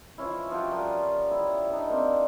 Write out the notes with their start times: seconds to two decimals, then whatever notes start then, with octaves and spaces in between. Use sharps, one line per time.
0.18 E3 F3 C#4 E4
0.50 F3 F#4 G4
0.72 F3 G3 A#4
1.31 B3 E4
1.71 D4 D#4
1.89 A#3 C4